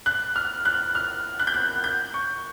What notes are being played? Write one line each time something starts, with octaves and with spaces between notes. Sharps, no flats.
F#6
F6
F#6
F6
F#6
G6
F#6
G6
C#6